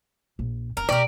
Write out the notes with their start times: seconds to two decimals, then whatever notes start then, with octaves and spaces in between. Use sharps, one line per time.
0.39 A#1
0.77 E1 D4 A#4
0.89 B2 A3 G4 A#4 D5